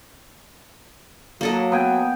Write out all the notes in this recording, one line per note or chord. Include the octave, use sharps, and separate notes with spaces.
F#3 A#3 A4 D#5
B3 G5 G#5